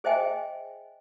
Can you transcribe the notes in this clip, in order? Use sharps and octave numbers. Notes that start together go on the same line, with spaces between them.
G#4 C5 D#5 E5 G5 G#5